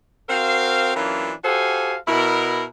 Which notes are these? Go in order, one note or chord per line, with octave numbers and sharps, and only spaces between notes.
C4 F#4 A#4 C5 F5
E3 F#3 A#3 C#4 D4 F4
F#4 G4 A4 C5 F5 G#5
B2 E4 A#4